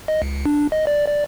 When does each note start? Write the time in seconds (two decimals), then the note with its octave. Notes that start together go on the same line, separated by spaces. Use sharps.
0.08 D#5
0.22 C#2
0.46 D4
0.72 D#5
0.87 D5
1.07 D5